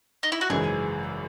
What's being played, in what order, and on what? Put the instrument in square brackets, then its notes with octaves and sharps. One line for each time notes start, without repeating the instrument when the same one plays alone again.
[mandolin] D#4
E4
F#4
[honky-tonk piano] G#1 F#2 C#3 E3 G#3 [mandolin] G#4